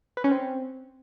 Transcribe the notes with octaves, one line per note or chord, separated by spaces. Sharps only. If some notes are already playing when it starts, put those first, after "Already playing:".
B4
C#4
C4